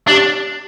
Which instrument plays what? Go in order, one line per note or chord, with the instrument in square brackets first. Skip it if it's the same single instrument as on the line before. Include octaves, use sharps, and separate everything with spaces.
[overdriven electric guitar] D4 [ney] G4